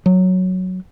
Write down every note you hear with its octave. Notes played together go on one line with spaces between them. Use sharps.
F#3